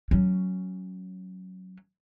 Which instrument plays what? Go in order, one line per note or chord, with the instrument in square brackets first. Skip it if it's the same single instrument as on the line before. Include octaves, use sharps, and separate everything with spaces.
[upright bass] F#3 C#4